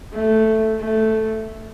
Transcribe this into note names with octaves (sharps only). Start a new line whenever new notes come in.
A3
A3